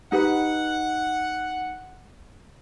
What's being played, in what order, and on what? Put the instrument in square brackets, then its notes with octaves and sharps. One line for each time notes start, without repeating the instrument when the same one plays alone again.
[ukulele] D#4 G4 B4 [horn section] F#5